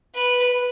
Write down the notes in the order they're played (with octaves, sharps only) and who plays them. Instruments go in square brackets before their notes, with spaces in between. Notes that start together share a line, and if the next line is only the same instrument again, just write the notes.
[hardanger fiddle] B4